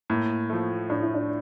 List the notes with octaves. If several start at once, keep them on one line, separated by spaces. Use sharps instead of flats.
A2 A#3
F3 A3
A2 D4
E4
D4